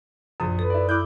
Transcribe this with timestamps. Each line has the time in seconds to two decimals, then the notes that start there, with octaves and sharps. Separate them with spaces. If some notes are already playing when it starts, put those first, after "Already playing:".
0.40 A#1 F#2 D#6
0.59 A4 B4
0.70 E4 D5
0.89 E4 D6 F#6 G6